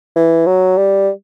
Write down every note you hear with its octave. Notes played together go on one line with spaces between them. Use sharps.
E3
F#3
G3